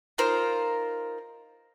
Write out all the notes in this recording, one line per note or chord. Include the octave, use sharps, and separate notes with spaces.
D#4 F4 A#4 C5